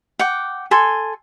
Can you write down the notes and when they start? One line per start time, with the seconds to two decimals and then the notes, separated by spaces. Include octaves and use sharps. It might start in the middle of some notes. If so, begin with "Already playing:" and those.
0.19 F#5 G5 D6
0.71 A4 G#5 C6